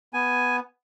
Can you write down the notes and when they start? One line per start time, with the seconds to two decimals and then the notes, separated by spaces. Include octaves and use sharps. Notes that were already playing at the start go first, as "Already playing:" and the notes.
0.13 B3 G#5